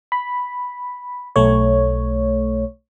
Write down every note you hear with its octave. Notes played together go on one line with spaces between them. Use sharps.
B5
B1 A3 C#5